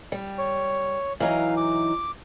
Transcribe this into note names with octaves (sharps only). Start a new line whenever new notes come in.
G3
C#5
E3 F#3 D#4 F5
D6